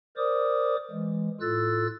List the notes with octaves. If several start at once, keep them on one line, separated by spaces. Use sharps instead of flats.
A#4 C5 D5 D6 D#6
E3 G#3
A2 F4 A4 E6 F#6 A6